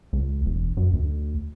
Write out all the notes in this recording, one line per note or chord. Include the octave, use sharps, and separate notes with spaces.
C#2
E1
F#2
D2